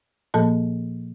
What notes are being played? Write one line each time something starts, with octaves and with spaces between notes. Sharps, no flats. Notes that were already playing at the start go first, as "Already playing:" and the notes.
A#2 F3 A#3 A4 A5